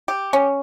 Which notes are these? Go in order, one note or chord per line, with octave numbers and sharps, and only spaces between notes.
G4
C#4